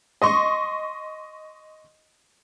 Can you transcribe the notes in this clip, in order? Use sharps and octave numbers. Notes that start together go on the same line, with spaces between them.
D#5 C6 C#6